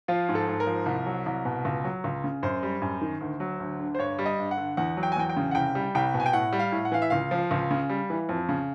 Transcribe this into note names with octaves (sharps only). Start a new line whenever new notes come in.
F3 F4
G#2
A4
G#2
A#4
F3
C2
F#3
C2
B2
C#2
F#3
C#2
C#3
F#2 C5
G3
F#2
D#3
D2
F#3
D2
D3
C5
G2 C#5
G3
D#5
G2
F#5
D3
E2 F#5
F#3
G5
G#5
E2 G5
G5
C#3
F#5
C2 G5
G3
C2 G5
B2
G#5
G5
A2 F#5
G3
F5
A2
F#5
E3 F5
E5
C#2 F5
F3
C#2
C#3
G3
E3
F2
C#3